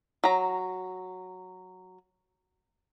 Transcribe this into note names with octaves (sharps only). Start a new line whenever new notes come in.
F#3 A#5